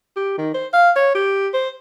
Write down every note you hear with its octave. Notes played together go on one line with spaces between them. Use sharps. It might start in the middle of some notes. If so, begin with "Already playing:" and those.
G4
D#3
C5
F5
C#5
G4
C5